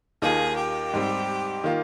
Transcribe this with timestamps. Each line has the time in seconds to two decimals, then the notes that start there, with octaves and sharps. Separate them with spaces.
0.21 D#2 D#3 A#3 F4 G#4
0.57 G4
0.93 G#2 G3 C4
1.64 D#3 A#3 F4